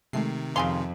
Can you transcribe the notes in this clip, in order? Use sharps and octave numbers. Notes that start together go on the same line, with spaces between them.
C3 D#3 G#3 A3 C7
F2 C#3 G#4 F5 C6